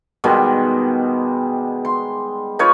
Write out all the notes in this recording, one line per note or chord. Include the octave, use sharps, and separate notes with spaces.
B2 D#3 G3 G#3
C6
D#4 F4 B4 C#5